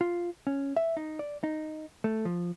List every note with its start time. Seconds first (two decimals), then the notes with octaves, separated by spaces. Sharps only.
0.01 F4
0.47 C#4
0.76 E5
0.97 D#4
1.19 D5
1.44 D#4
2.04 A3
2.25 F3